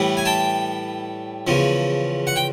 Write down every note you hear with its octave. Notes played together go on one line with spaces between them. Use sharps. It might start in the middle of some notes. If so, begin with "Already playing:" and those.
Already playing: A2 E3 G3
G#5
G5 A5
E2 C#3 F3
F#5
G5